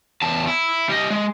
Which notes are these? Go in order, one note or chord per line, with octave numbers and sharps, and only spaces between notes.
E2 A5
E4
G3 D#5
G#3